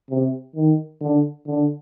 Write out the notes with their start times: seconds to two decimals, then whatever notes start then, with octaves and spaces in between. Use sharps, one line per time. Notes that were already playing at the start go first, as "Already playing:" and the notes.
0.11 C3
0.56 D#3
1.01 D3
1.47 D3